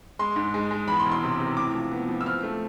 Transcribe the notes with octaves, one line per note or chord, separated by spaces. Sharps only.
G#3 C6
G#2
G#3
G#3
E2 B5
C6
E1
C6
C3
C3
A2 D6
F3
B3
F3
E6
C4 F6
A3